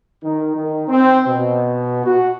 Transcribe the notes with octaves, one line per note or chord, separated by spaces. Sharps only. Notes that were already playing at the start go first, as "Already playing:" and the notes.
D#3
D#3
C4
B2
F#4